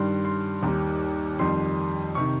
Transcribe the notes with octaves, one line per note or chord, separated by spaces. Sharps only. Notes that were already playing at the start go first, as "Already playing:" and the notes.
Already playing: G2 D#3 G3 C6
C6
D#2 D#3 G3 A#5
F2 D#3 G3 C6
C3 D#3 C#6